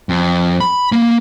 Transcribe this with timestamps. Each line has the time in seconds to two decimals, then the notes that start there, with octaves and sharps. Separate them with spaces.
0.09 F2
0.60 B5
0.92 A#3